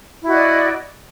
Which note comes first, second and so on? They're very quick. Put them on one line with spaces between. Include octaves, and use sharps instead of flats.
E4 F#4 D#5 D5